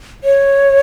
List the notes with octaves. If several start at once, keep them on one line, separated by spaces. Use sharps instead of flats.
C#5